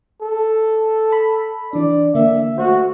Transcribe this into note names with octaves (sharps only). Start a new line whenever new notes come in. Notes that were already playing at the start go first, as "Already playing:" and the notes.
A4
B5
E3 D4 D5
D3 A#3 E5
A3 F#4 C5